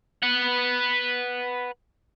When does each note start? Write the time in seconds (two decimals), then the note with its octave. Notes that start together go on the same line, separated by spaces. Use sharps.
0.23 B4 F#5